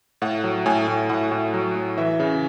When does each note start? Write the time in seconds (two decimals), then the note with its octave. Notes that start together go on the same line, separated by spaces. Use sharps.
0.22 A2 F#5
0.44 F#3
0.66 A2 G#5
0.87 A2
1.09 A2 F#5
1.31 A2
1.54 F#3
1.75 A2
1.98 E3 E5
2.20 C#3